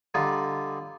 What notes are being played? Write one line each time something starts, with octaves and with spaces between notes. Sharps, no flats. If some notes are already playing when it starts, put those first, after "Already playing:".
D3 G3 D#4 F4